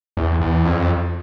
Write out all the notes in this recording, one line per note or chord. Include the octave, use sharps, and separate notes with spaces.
E2
E2
F2